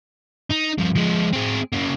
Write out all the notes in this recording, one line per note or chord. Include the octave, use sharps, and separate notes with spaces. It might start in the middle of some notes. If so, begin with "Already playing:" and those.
D#4
G2 F3
F3 G#3
C4 G#4
C#3 A#3